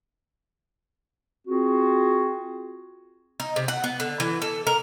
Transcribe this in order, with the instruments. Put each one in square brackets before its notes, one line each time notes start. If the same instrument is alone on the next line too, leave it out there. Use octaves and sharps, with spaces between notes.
[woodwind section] C4 F4 F#4 G#4
[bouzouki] D#4
C3
F#5
B3
D3
E3
A4
A#4